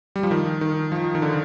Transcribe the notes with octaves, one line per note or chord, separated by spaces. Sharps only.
G3
F3
D#3
D#3
F3
D#3
D3